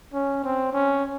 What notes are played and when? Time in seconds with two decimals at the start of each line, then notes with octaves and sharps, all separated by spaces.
0.14 C#4
0.44 C4
0.73 C#4